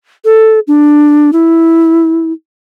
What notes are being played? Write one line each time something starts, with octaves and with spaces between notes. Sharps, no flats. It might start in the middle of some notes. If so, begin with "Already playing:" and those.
A4
D4
E4